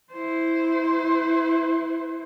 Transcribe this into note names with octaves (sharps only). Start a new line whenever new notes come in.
E4 C5